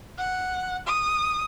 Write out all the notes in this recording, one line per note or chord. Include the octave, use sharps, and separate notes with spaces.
F#5
D#6